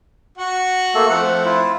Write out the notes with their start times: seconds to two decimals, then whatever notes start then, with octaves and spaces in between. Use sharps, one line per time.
0.38 F#4 F#5
0.95 A3 A#3 A4
1.10 F3 A3 C4 F#5
1.46 E4 F4